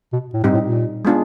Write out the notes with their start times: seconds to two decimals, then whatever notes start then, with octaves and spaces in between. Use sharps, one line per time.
0.13 B2
0.34 A2
0.44 G#2 G3 C4 D#4 G4
0.54 A2
0.64 A#2
1.05 G#3 B3 D4 F4 G#4